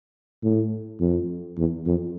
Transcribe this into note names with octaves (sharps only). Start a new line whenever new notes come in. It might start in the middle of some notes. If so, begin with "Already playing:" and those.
A2
F2
E2
F2